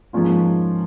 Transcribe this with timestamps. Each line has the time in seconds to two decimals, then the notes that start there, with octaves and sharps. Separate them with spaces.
0.13 G#2 F3 A#3 C#4 F4